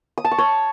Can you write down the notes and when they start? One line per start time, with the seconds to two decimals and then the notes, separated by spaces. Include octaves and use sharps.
0.18 D#6
0.25 A5
0.31 C#6
0.38 C#5